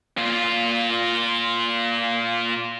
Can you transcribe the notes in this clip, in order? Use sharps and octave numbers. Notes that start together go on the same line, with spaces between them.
A#2 F4